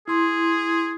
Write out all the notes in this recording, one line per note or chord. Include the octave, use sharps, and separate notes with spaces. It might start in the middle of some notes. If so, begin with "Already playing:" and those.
E4 G#4 C6